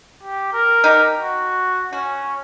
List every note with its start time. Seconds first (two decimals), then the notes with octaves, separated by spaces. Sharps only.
0.23 G4
0.53 A#4
0.84 D#4 G4
1.20 F#4
1.93 C#4 F#4